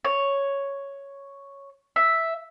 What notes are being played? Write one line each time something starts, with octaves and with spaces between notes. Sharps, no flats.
C#5
E5